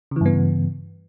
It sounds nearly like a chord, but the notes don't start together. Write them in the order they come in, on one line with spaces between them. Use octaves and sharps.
C#3 E3 G2 B3